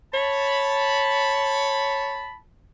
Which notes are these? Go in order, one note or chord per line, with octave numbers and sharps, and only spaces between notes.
C#5 A5 B5